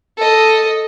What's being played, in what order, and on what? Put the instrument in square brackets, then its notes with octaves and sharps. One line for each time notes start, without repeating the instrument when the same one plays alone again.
[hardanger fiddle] A4 D#5